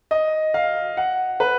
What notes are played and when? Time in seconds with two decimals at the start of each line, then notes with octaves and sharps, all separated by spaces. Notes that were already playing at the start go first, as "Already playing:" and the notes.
0.11 D#5
0.54 F5
0.97 F#5
1.40 B4